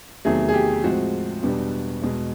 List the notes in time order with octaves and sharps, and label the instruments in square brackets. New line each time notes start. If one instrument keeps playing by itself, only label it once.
[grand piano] E2 C3 D#3 F#3 A3 G#4
G#4
G4
A2 F3 G#3 C4 F#4
E2 B2 G3 B3 D4
E2 B2 G#3